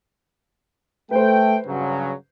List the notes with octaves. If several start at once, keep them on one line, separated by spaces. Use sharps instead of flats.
A3 B4 C5 G5
G2 C#3 F#3